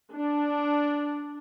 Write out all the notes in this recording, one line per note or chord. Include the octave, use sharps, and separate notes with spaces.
D4